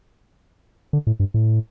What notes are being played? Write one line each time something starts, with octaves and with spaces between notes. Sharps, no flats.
D3
A2
G2
A2